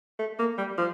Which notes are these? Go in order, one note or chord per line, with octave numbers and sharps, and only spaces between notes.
A3
A#3
G3
F3